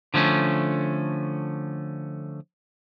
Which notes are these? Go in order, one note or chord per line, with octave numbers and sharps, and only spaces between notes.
D3 F3 A3 C#4